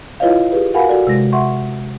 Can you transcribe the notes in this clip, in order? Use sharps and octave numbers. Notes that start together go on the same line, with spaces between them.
E4 F4 B4 C#5 D#5 F5
G4 G#4 B4
F#4 A#4 F5 F#5 G#5 B5
F#4 A4 D5
C3 G#3 A#6
E5 F#5 C6 C#6